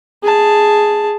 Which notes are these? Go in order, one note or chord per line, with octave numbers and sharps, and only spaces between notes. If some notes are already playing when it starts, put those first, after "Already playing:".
G#4 A5